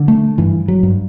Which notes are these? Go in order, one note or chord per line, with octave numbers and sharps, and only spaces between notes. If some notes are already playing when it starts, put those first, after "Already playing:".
Already playing: D3
A3
G2 E3
F#3
G2